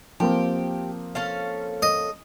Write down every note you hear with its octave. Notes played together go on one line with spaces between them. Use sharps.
F3 A#3 C4 G4
C#4 A4 F5
D#5